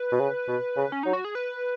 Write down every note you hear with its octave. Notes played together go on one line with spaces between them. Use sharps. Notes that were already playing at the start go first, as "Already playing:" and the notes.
Already playing: B4
B2
C#3
B2
C#3
C#4
F#3 D#4
F#4
G#4
B4